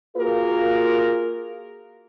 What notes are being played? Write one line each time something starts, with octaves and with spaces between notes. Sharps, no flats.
A#3 F4 F#4 G#4 A#4